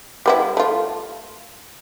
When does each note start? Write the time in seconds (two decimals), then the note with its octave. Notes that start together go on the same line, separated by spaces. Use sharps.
0.26 G3 B3 E4
0.57 A3 F4